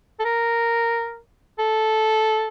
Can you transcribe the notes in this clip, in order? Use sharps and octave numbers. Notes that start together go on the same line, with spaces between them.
A4
A#4
A4